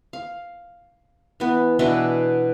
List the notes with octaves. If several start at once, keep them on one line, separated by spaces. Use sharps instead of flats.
F5
E3 B3
B2 E3 D4 E4